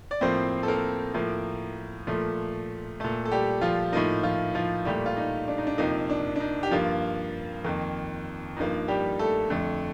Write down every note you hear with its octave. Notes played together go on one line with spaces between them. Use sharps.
D5
A2 F3 A#3 C4 C5
A4
A#3 A#4
A2 F3 A#3
A#2 F3 A3
A#2 A3 A4
A4
G3 G4
F3 F4
A2 F3 A#3 D#4
F3 F4
F3 F4
A#2 G3 A3 G4
F4
D#4
D4
D#4
D4
F2 C3 F3 A#3 D#4
D4
D4
D#4
G4
G2 F3 A#3 F4
F2 D#3 A#3
G2 F3 A#3 D#4
G3 G4
A3 A4
F2 D3 A3